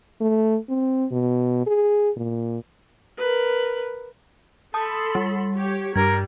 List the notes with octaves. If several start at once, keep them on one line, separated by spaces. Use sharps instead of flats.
A3
C4
B2
G#4
A#2
A#4 B4
A4 A5 B5 C6 D#6
G3
G4 C#5
G2 G3 A#4 G#6